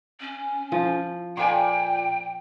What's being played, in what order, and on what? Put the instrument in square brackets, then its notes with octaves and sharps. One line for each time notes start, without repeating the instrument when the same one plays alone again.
[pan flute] C#4
[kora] F3
[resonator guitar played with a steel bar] A#2 D5 G#5 [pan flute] G5